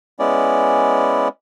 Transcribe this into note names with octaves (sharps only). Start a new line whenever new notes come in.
G#3 B3 C#4 E4 D5